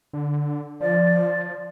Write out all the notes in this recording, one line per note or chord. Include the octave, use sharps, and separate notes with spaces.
D3
F3 D5